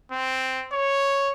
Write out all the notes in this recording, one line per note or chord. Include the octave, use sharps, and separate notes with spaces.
C4
C#5